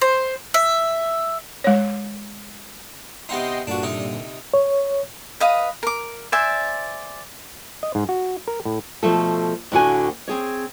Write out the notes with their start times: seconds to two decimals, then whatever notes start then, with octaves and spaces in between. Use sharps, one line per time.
0.01 C5
0.54 E5
1.64 G#3 C#5
3.29 C3 B3 D#4 D#5 G5 C6
3.67 G2 A#2 D3 D4 F#4
3.83 C3 D#4
4.54 C#5
5.40 B4 D#5 F5 D#6
5.83 A#4 D6
6.32 C5 D5 E5 G#5
7.83 D#5
7.95 G#2
8.09 F#4
8.48 A#4
8.65 A2
9.03 B2 F3 A3 A4
9.72 D2 A2 D3 F#4 G#5
10.28 C4 G#4 C#5